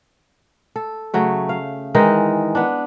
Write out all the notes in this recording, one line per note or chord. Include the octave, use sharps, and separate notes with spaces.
A4
C#3 F#3 A3
F5
D#3 E3 G#3 D#4
B3 D4